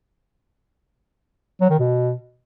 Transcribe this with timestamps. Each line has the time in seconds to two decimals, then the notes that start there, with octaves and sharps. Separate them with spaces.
1.61 F#3
1.70 D#3
1.79 B2